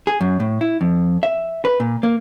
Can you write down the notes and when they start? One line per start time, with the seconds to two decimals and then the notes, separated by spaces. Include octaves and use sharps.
0.07 G#4
0.21 F#2
0.40 A2
0.61 E4
0.81 F2
1.23 E5
1.65 B4
1.80 A#2
2.03 A#3